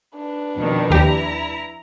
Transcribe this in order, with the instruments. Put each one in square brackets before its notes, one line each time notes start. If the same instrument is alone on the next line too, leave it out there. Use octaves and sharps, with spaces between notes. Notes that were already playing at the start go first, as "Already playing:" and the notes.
[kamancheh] D4 B4
[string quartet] F2 B2 D#3
[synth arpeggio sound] D#2 G4 [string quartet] E4 A#5